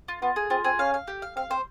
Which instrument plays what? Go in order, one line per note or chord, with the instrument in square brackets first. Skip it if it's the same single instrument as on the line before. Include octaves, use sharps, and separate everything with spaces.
[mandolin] F4
[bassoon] B3 [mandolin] F4
[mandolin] G#4
[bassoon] C4 [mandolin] F4
[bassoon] C4 [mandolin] G#4
[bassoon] C#4 [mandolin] F5
[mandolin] F5
G4
F5
[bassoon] C4 [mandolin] F5
[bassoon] C4 [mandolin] C5